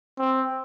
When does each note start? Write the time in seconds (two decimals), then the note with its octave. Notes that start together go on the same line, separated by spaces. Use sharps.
0.19 C4